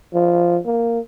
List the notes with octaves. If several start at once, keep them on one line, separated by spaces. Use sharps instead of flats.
F3
A#3